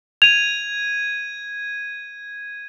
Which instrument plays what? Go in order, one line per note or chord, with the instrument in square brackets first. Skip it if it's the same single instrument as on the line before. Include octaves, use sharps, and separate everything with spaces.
[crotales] G#6 D#7 [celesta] F7